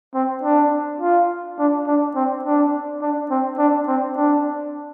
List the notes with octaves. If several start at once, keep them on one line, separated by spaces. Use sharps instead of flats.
C4
D4
F4
D4
D4
C4
D4
D4
C4
D4
C4
D4